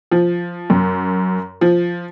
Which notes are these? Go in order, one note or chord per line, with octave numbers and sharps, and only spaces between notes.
F3
F#2
F3